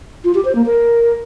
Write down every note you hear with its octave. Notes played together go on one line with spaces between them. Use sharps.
F4
G4
C5
A#3
A#4